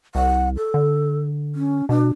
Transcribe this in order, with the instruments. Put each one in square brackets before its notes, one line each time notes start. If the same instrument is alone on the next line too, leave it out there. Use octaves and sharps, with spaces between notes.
[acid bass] C2 [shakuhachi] F#5
[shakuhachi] A4
[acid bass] D3
[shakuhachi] C#4
[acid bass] B2 [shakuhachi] D4